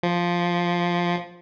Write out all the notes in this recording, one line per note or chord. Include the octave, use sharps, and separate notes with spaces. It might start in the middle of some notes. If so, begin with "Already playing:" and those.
F3